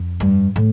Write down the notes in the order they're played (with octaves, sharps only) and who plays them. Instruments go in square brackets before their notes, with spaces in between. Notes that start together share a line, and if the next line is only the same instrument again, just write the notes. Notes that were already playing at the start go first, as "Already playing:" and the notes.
Already playing: [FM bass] F2
[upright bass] G2
A2